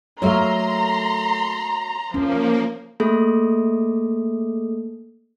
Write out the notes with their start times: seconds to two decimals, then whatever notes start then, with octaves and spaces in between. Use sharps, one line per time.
0.22 F#3 A3 A#3 C#5 E5 F5 A#5 C6
2.14 F3 A#3 C#4
3.00 A3 A#3 G#4 A4